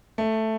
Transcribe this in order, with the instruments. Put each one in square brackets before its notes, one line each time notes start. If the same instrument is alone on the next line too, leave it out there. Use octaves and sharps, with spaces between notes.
[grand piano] A3